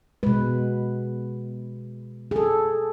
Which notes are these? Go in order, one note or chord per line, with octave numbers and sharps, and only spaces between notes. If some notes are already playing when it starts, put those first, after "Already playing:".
B2 G#3 B4
G#4
A4